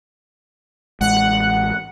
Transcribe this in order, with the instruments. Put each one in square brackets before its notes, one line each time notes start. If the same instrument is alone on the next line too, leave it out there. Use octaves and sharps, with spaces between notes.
[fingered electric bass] A1 G#3 [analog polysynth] F#5